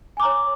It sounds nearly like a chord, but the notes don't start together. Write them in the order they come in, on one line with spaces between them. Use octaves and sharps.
G#5 D6 A#5 C#5